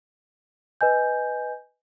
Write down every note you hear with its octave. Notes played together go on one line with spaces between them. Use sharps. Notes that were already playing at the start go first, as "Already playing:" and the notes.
B4 D#5 G#5 G6